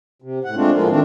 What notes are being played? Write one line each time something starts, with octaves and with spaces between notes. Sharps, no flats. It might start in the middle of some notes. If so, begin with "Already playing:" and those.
C3
A2 F#5
G#3 A3 C4 D4 F4
A2 F3 G#3 A#3 F4
D#3 A3 C4 D4